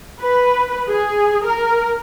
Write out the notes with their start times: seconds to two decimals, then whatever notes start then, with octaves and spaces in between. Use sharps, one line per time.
0.20 B4
0.89 G#4
1.46 A#4